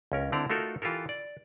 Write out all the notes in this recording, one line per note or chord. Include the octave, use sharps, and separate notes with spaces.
C#2 C#4 A#4
D3 C4 E4 D5 A#5
A3 D#4 F4 F#4 A4 A#4
E3 F4 G4 A4 A#4
D5